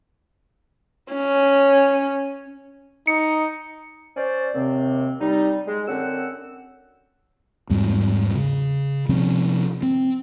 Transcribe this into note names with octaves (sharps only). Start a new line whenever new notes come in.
C#4
D#4 C#7
C#4 C5 D5
D#2 C3 C4
G3 D#4
G#3
F#2 D3 C4 C#4 F#5 E6
E2 G#2 G3 C4
C#3
C3 F3 C4 C#4
C4